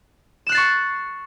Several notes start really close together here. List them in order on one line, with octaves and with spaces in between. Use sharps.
E7 F#6 C7 A6 C#6